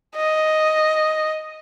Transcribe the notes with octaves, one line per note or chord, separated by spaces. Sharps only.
D#5